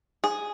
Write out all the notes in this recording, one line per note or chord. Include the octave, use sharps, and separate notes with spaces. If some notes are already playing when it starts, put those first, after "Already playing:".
G#4